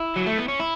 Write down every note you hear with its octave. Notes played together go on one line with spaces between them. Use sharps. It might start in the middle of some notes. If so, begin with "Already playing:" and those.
Already playing: E4
F#3
A3
B3
C#4
E4